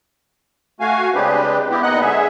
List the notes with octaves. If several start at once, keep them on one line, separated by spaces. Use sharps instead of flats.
A3 F#4 F5 G#5
C#3 G#3 C4 D4 G4 B4
B3 C4 E4 G4
A#2 B3 D#4 D#5 F#5 F#6
G#2 D3 G#4 E5